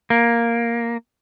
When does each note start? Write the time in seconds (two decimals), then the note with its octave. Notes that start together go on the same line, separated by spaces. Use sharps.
0.10 A#3